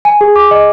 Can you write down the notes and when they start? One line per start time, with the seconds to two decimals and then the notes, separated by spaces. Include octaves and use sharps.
0.05 G#5
0.21 G#4
0.36 D6
0.51 D#5